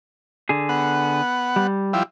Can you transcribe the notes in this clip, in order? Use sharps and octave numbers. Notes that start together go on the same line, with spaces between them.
D3 G#4
B3 F#5
G3
F3 G3 E4